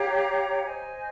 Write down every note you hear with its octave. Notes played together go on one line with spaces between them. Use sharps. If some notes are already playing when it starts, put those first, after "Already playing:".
Already playing: G4 C#5 F5 A#5
C5 D#5 G#5